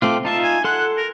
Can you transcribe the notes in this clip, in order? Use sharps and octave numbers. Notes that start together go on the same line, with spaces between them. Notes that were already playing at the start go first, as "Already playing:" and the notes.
A3 C4 F4 D6
D#4 F4 E5 A5
G#5
A4 F#5 C6 F#6
A#4